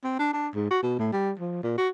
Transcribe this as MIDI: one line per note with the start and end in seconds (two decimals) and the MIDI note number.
0.04 0.15 60
0.19 0.33 62
0.33 0.48 62
0.55 0.66 44
0.71 0.79 66
0.83 0.97 47
0.99 1.12 45
1.13 1.32 55
1.39 1.60 53
1.63 1.75 46
1.78 1.89 66